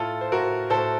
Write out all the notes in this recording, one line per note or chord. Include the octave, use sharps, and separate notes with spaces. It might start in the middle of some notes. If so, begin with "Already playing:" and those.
Already playing: A2 F4 A4
C5
A2 F#4 A#4
A2 A4 C5